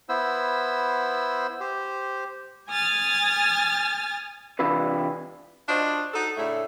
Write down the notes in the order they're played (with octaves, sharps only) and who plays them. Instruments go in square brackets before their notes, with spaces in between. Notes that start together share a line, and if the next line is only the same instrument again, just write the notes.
[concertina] B3 E4 C5 E6
G4 C5
[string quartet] G#5 D#6 F6 A6
[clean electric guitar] C3 E3 D4 E4 F4 B4
[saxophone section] D4 F4 F#4 C5 D#5
D#4 F#4 A4
A2 C#3 A3 D4 E5